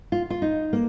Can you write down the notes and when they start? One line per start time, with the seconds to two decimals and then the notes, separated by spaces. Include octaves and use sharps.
0.12 F4
0.30 F4
0.42 D#4
0.73 A#3